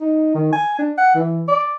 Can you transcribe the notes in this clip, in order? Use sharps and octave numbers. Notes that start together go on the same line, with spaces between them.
D#4
D#3
G#5
D4
F#5
E3
D5